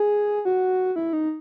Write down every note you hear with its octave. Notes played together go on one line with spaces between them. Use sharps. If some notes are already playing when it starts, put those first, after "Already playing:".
Already playing: G#4
F#4
E4
D#4